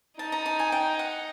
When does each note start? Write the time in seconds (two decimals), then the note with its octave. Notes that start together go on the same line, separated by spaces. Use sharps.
0.19 D#4 A5
0.32 A#5
0.46 A5
0.59 G#5
0.72 G5
0.99 F#5